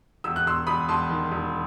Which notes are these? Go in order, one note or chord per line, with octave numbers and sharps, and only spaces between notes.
E1 E6
F#6
E1 C6 E6
E1 B5 D#6
E1 A5 C6
D#3
E1